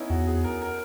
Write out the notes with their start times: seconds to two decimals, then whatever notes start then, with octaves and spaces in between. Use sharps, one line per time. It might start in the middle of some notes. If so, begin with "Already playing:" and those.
Already playing: B3 C#4 D#4 E4
0.10 E2 F#4
0.27 G#4
0.44 A#4
0.62 A#4